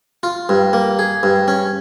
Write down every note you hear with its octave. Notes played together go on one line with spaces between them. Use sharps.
F4
G2
A#3
G#4
G2
C#4